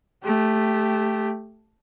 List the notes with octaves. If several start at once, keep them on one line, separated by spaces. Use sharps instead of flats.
A3 G4